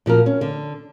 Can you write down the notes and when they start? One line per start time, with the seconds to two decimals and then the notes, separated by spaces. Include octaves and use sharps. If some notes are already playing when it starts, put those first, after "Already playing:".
0.06 A#2 F3 F#4 A#4
0.26 C#4
0.41 D3